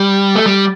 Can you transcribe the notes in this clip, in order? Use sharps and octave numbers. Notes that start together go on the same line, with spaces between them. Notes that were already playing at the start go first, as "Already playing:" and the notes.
Already playing: G3
A3
G3